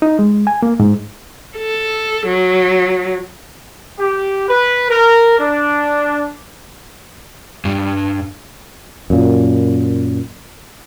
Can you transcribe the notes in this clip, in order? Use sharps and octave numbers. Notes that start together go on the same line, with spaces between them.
D#4
G#3
G#5
A#3
G#2
A4
F#3
G4
B4
A#4
D4
G2
F#2 A#2